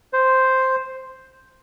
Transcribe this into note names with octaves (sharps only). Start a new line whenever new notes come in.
C5